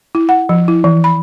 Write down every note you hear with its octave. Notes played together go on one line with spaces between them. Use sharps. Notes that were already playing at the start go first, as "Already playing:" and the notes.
E4
F#5
F3
E4
E3
B5